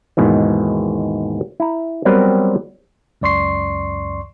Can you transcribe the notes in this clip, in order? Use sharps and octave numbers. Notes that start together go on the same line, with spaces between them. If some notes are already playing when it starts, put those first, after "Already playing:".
D#2 G#2 B2 D#3 E3
E4 A#5
F#3 G3 B3 C4 A#4 B4
C#2 F#2 D5 C6 C#6 C7